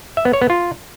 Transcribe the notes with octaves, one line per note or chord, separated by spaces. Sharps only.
E5
B3
C#5
B3
F4